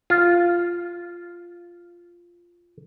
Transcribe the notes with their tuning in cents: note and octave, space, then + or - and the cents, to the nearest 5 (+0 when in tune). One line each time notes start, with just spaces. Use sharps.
F4 -5